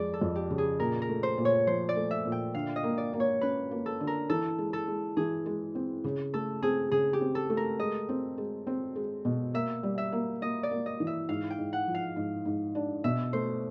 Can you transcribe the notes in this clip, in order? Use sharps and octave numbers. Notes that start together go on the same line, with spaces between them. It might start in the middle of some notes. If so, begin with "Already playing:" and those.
Already playing: F2 G#3 D5
A4
F2
G4
C#3
G#4
A#2 A#4
A#4
A3
C5
A#2
C#5
F3 C5
D5
A3
E5
A#2
G5
D3 F5
D#5
A#3
D5
A#3
C#5
C#4 B4
A#3
A4
D3
A#4
E3 A4
G#3
A4
G#3
E3 G#4
G#3
C4
C#3
A3 A4
C4 G#4
C#3 G#4
G4
C4
A4
A3
A#4
G#3 D#5
C4
G#3
C4
G#3
B2
A#3 E5
G3
E5
A#3
A#3 D#5
D5
A#3
D#5
E3
E5
G#2 F5
G5
G#2
F#5
F3
F5
G#2
G#2
D4
B2 E5
A3 C5